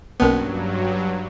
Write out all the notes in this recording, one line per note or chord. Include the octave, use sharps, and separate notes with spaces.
B1 G2 F#3 A#3 B3 C#4 A#4